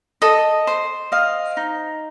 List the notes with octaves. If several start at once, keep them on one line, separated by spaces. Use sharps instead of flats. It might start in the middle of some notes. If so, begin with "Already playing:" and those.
A4 D#5
C5
D#5 F5
D#4